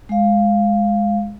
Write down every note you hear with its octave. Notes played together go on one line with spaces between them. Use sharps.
G#3 F5